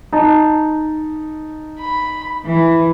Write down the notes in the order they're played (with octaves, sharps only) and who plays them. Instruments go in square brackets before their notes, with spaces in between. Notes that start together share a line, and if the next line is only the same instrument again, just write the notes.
[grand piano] D#4 A5
[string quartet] B5
E3